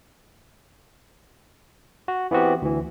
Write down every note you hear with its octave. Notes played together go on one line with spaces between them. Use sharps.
F#4
E3 B3 C4 F#4 G4
D2 E3